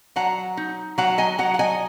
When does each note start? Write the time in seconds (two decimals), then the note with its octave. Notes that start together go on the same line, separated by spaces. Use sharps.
0.16 F#3 F#5 A#5
0.57 D#4
0.98 F#3 F#5 A#5
1.18 D#5 G#5
1.38 F#3 F#5 A#5
1.54 F#5
1.59 D#5 G#5